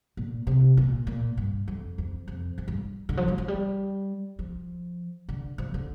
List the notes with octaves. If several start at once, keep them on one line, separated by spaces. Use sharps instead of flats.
A#2
C3
A#2
A#2
G2
F2
F2
F2
F2
G2
D3
F3
G3
F3
G3
F3
D3
F3
D3